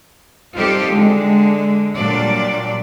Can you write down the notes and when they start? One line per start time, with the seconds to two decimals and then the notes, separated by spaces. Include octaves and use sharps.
0.55 G3 C4 D#4 F4 G4 A4
0.90 D3 G#3
1.96 A#2 F#3 G3 D4 D5